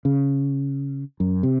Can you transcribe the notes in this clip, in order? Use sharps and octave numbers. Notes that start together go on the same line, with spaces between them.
C#3
F#2
C3